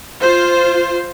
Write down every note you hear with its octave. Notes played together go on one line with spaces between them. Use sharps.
F4 C5